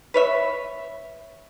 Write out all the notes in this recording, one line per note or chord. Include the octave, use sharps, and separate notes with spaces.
B4 C#5 E5